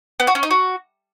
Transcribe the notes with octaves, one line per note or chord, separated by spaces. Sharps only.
B3
F#4
C#4
D#4
F#4